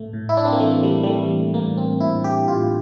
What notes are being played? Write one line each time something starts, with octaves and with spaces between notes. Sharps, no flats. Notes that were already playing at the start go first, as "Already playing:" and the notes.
Already playing: A2 A3
A2
E4
D4
C4
A#3
E3 A3
G3
G3
E3 A3
A2 A#3
C4
A2 E4
G4
A2 F4